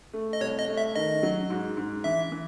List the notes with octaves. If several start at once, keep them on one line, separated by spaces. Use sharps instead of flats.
A3
D#5
C2 C#5
D#5
A3
E5
D#3 D#5
F#3
G#2
G#2
E3 E5
E3